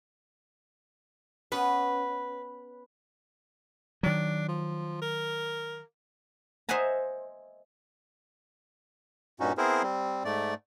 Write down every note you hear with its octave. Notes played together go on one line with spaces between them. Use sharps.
B3 C#4 B4
D#3 F#3 D4
F3
A#4
C5 D#5 E5 F#5 G#5 A#5
G2 A#2 C#4 D#4 F#4
B3 C4 E4 G#4 A#4 C5
G3 C4
G#2 A3 D5